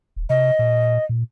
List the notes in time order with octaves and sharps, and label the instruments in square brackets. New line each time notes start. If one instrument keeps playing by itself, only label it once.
[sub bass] D#1
[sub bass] C3 [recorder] D#5
[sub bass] A#2
A#2